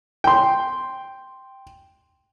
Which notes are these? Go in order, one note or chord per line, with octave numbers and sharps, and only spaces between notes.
G5 C6